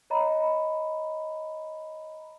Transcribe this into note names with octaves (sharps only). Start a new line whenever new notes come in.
C#5 D#5 A#5 B5